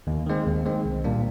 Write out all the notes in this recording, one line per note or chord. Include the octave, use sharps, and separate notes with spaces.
D#2
D#3 G#3 C4
D#2
D#3 G#3 C4
C2
A#2 G3 A#3 D4